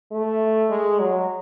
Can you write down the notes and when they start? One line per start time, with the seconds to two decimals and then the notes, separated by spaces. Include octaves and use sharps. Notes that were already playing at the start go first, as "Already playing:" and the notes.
0.12 A3
0.70 G#3
1.00 F#3